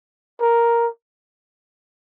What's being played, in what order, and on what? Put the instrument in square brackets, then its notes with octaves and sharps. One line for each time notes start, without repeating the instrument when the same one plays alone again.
[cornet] A#4